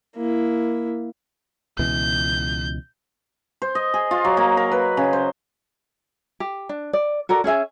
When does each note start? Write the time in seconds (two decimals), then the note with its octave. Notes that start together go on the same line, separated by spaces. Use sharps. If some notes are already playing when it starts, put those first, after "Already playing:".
0.16 A#3 E4
1.79 C#2 B2 E3 G6
3.62 C5
3.75 D#5
3.94 G#4
4.11 F4
4.25 F#3
4.37 A#3
4.57 A#4
4.72 B4
4.97 C#3
5.13 C5
6.40 G4
6.69 D4
6.93 D5
7.29 F#4 A4 A#4 D5
7.44 C#4 G#4 E5 G#5